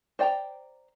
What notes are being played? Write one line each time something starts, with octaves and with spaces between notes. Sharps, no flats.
C5 D5 G5 A5 A#5